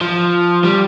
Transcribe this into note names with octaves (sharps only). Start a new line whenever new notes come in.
F3
G3